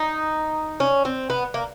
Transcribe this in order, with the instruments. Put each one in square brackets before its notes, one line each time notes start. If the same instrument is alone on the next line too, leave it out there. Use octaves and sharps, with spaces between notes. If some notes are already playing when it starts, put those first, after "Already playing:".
Already playing: [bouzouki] D#4
C#4
C4
B3
A#3